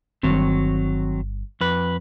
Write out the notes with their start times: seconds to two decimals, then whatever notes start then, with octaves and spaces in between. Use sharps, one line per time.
0.23 G1 G2 D#3 F#3 C4
1.61 F2 B4